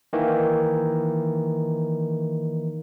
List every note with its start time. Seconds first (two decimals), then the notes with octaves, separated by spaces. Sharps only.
0.13 D#3 E3 A#3